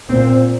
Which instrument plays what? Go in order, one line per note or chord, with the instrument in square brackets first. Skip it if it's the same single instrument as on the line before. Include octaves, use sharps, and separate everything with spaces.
[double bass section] A#2 C4